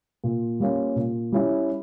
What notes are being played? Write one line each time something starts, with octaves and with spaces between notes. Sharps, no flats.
A#2
G3 A#3 C#4 F4
A#2
G3 C#4 E4